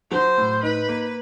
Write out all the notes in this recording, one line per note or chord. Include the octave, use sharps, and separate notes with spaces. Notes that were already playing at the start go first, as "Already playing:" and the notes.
F#3 C5
A2
D#4 B4
A#3